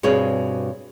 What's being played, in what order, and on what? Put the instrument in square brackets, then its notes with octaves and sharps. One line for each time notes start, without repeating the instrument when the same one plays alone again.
[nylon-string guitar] G2 B2 C4 G#4 C#5